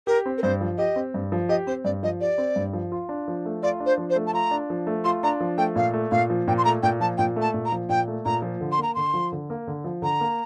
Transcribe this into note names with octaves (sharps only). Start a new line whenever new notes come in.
G4 A#4
C4
A#4
G2 C5
F3
G4 D#5
C4
G2
F3
G4 D#5
C4 C5
G2 D5
F3 D#5
G4 D5
C4
G2
F3
F4
D4
F3
A3
F4 D5
D4
C5
F3
C5
A3
A5
F4 A#5
D4
F3
A3
F4 C6
D4 A#5
F3
A3 G5
A#2 F5
A3
A#2 F5
F3
A#2 G5
C6
A3 A#5
A#2 G5
F3 A5
A#2 G5
A3
A5
A#2
A#5
F3
A#2 G5
A3
A#2 A#5
F3
D3
C6
A#3 A#5
D3 C6
F3
D3
A#3
D3
F3
D3 A#5
A#3